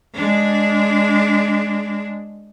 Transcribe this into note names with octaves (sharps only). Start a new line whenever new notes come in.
G#3 D4